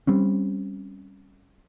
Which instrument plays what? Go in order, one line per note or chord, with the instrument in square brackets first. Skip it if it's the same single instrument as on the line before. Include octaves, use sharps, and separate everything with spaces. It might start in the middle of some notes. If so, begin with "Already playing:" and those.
[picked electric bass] G3 C4 C#4